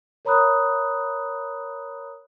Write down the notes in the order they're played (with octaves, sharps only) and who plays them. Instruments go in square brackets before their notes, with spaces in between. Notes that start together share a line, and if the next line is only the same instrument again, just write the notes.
[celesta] A#4 C#5 A#5 B5 D#6 F#6